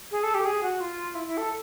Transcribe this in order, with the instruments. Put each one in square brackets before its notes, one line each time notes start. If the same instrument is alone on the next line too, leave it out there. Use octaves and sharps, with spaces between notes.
[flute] G#4
A4
G4
G#4
F#4
F4
E4
E4
A4